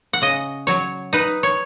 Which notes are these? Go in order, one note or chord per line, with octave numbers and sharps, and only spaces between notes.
F#5
C#3 D#5
F#3 C#5
D#4 B4
C#5